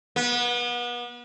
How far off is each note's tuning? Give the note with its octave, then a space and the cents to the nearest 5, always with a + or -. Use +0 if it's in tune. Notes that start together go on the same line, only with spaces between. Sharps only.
B3 -35